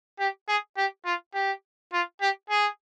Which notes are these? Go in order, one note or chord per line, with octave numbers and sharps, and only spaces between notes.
G4
G#4
G4
F4
G4
F4
G4
G#4